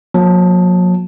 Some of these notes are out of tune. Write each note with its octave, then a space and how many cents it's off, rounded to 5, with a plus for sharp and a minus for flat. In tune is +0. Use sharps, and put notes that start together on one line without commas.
F#3 -40 A#3 +15 A5 +0